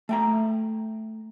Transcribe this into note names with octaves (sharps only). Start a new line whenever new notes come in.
A3 G5 A#5